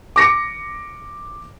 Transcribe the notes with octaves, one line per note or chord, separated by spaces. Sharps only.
D6 A#6 C#7